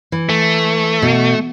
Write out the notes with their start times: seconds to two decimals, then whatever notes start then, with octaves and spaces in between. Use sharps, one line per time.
0.12 E3
0.29 A3
1.02 B2